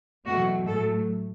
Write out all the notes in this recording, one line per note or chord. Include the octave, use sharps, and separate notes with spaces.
E2 B2 F#3 A3 F#4
A2 F#3 A3 A4